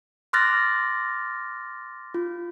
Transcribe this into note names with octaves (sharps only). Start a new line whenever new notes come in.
C6 D6 F6 F#6 A6 A#6
F4